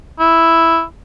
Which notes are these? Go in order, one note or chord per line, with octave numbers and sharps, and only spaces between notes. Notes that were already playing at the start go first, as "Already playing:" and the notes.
E4